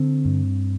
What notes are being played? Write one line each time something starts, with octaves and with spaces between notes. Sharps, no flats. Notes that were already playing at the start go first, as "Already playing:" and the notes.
Already playing: D3 C4
G2